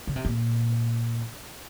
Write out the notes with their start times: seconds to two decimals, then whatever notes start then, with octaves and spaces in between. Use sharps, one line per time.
0.07 C#3
0.16 C3
0.25 A#2